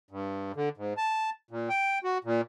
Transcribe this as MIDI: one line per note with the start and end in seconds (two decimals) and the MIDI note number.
0.11 0.52 43
0.56 0.69 50
0.77 0.93 44
0.97 1.30 81
1.51 1.69 46
1.69 1.99 79
2.04 2.18 66
2.24 2.41 46